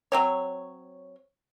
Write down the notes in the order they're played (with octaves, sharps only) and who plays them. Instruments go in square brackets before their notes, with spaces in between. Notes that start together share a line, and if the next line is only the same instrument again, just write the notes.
[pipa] F#3 C4 C#5